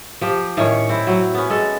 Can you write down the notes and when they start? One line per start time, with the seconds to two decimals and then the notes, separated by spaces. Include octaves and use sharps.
0.21 F3 G4
0.57 A2 D#3 C#4 C#5
0.89 C4 E4
1.07 F#3 C4
1.34 B3 C#4
1.50 G#3 A4